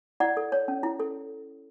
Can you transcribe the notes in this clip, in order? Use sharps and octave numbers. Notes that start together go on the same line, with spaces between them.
E4 D5 F#5
A4
C#5
C#4
E4
A4